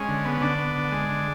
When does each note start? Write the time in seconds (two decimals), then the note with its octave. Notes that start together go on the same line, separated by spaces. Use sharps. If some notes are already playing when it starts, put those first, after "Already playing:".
Already playing: G#3 C#4
0.08 D3
0.25 B3
0.41 D3 D4
0.58 B3
0.75 D3
0.91 G#3
1.09 D3